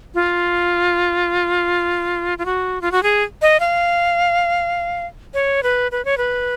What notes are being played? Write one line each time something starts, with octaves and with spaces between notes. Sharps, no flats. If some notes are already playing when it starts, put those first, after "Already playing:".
F4
F4
F#4
F4
F#4
G#4
D#5
F5
C#5
B4
B4
C#5
B4